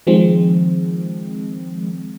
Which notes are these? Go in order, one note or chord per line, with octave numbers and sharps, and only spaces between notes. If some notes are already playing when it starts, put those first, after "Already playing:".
D#3 F3 G#3 C4